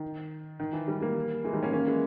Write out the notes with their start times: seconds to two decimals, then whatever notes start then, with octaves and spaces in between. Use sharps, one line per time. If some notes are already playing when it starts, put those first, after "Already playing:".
Already playing: D#3
0.60 D#3
0.73 E3
0.88 D#3 G3
1.01 G3 A#3
1.44 E3 G#3
1.53 D#3 G3
1.63 A#3 C#4
1.73 A#3 C#4
1.87 E3 G#3